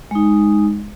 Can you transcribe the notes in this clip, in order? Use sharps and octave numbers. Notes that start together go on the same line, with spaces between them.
G#3 D#4